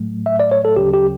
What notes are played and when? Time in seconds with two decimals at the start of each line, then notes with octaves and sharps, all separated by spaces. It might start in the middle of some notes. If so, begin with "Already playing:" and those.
Already playing: A2 F#3 A3
0.26 E5
0.40 D5
0.52 C#5
0.65 A4
0.76 D2 C#3 F#3 C#4 G4
0.94 G4